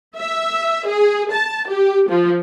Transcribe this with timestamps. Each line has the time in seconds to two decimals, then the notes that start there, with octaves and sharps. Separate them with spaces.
0.16 E5
0.87 G#4
1.32 A5
1.68 G4
2.09 F3